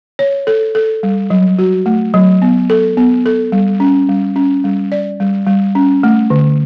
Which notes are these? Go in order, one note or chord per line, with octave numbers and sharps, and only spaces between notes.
C#5
A4
A4
G3
F#3
F#4
A3
F#3
B3
A4
B3
A4
G3
C#4
G3
C#4
G3
D5
G3
G3
C#4
A3
D3